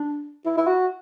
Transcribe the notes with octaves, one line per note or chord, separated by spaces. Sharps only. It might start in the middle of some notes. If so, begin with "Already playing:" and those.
Already playing: D4
E4
E4
F#4